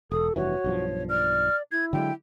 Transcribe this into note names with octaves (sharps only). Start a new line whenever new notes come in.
E1 A4 D#6
F1 G2 E3 F#4 C#5
B1 G2 F3
D5 F6
E4 G#6
D3 F#3 G#3 G5